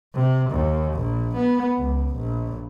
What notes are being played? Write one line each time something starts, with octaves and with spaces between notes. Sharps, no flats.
C3
D#2
A#1
B3
C#2
A#1